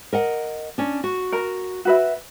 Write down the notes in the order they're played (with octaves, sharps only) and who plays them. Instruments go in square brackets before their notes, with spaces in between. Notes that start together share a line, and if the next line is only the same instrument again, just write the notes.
[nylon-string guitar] A#4 D#5 F#5
C#4 D4
F#4
[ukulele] A#4
F#4 B4 E5